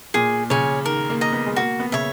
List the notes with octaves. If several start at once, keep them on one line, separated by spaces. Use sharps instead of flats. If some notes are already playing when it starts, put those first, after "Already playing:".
A#2 G#4
C#3 C#5 G#5
D#3 A#4
A#3
D#5 A#5
B3
G#3
A#3 F#4
B3
C#3 C#5 E5